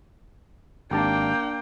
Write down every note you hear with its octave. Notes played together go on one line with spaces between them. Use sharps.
G#1 A#3 D4 G4 G5 A5